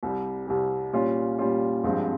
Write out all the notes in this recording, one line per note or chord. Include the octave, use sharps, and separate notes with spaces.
C2 C3 G3
C2 C3 G3
A#2 G3 C#4 F4
A#2 G3 C#4 F4
G#1 G2 F3 G#3 C4